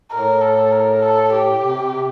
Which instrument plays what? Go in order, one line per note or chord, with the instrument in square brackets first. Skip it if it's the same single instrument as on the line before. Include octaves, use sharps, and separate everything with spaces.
[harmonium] A2 [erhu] A#4
[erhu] A4
A#4
A4
G4
[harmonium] C3
C3